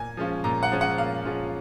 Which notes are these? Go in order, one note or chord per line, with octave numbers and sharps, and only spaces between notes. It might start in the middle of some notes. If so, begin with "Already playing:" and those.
Already playing: A#2 G#5
F3 G#3 C#4 F4
A#2 A#5
F#5
F3 G#3 C#4 F4
F#5
A#2 F5
F3 G#3 C#4 F4